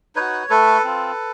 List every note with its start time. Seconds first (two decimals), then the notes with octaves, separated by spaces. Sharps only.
0.16 D#4 F#4 B4 C#5
0.50 A3 A4 B4
0.84 C4 F4